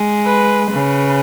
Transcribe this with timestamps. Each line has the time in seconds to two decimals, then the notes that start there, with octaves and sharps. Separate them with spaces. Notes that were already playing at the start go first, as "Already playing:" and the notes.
Already playing: G#3
0.25 B4
0.70 C#3 B4